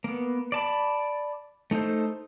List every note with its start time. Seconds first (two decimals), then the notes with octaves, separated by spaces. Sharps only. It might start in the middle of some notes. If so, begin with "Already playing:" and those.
0.04 A#3 B3
0.52 D5 A5 B5
1.71 A3 D#4 A4 C5